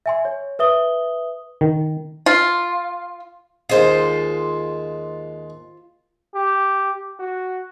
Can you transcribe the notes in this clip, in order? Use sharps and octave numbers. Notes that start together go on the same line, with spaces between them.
E5 G#5 C6
C#5
B4 E5 D#6 G7
D#3
F4
D#2 G#3 F4 C5 D#6
G4
F#4